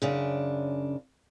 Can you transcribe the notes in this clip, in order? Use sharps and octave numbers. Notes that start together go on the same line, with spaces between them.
F#2 C#3 D4